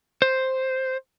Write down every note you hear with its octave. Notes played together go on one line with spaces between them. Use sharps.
C5